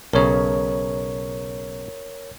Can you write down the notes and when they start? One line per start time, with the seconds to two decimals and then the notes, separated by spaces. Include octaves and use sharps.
0.13 B1 C#3 A#4 C#5